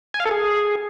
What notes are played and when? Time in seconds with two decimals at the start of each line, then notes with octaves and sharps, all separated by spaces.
0.14 G#5
0.20 F5
0.25 A4
0.31 G#4